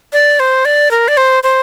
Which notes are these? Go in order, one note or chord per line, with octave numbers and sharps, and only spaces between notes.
D5
C5
D5
A#4
D5
C5
C5